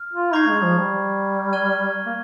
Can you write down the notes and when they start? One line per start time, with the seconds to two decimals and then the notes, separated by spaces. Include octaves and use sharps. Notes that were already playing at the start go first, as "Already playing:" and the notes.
Already playing: F6
0.13 F4
0.33 D#4 A#5 C#6 G#6 C7
0.48 G#3
0.63 F3
0.78 G3
1.53 F6 G#6 D#7 G7
2.06 A#3